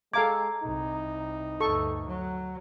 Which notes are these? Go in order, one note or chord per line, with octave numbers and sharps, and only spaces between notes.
G#3 A4 F5 A#5 D6 G#6
C2 D#4
D2 G2 A4 C#6
F#3